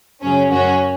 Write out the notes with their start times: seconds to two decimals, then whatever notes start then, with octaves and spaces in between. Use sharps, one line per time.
0.21 F#2 C#3 F#3 C#4
0.50 F#2 F#3 C#4 F#4